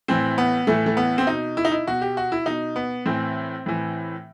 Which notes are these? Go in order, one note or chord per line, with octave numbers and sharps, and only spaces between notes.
A2 E3 C4
B3
A2 E3 A3
A3
B3
C4
B2 D#4
E4
D#4
E4
B2 F#4
G4
F#4
E4
B2 D#4
B3
A2 E3 C4
A2 E3